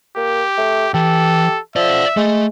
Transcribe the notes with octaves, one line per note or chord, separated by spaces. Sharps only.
A#3 G4
A3
E3 G4 A4
F3 D5 E5 F#5
G#3 A3